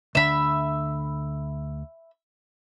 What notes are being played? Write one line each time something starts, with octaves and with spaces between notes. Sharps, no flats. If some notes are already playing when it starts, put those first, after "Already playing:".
D2 D3 E5 B5